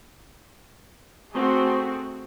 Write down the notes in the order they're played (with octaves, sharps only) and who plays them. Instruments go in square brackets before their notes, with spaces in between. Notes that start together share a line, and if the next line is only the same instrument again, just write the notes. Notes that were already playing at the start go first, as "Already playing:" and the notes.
[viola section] A3 C4 F#4 G#4